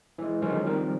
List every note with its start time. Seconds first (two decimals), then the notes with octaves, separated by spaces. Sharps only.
0.18 E3 G#3
0.42 D3 D#3 F3 F#3 G#3 C#4
0.64 D#3 F3 G3 C4 A#4